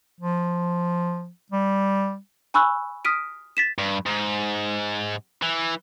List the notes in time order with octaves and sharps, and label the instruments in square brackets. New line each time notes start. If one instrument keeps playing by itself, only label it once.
[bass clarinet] F3
G3
[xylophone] G#5 B5 C#6 E6 F#6
D#6 F6 B6 D7 D#7
A6 B6 E7
[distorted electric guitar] G2
G#2
E3